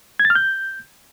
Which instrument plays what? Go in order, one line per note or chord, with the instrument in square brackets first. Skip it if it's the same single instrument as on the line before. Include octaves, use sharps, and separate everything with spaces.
[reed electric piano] G#6
A6
F6
G6